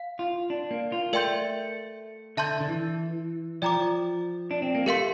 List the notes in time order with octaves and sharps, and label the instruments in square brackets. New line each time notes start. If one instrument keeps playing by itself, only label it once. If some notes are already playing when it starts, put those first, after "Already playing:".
Already playing: [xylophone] F5
[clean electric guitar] F4
D4
A#3
F4
[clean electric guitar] A3 [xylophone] A#4 D5 G5 C6 G6
[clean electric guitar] D3 [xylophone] E5 A5 C6 G6
[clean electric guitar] D3
E3
[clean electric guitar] F3 [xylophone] D5 G5 A#5 D6
[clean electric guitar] D4
C4
A#3
[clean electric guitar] A3 [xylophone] G4 A#4 F5 C6